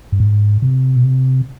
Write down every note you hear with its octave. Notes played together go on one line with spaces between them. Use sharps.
G2
G#2
C3
B2
C3